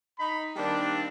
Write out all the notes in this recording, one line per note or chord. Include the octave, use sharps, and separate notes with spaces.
D#4 B5
D#3 G3 A#3 C4 D4